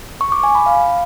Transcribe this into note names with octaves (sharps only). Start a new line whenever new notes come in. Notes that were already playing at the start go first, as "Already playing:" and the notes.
C#6
D6
G#5
B5
F5